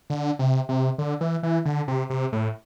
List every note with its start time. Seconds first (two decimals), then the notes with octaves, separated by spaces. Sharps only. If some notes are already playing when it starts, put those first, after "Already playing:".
0.10 D3
0.39 C3
0.69 C3
0.98 D3
1.21 E3
1.43 E3
1.65 D3
1.88 C3
2.10 C3
2.33 A2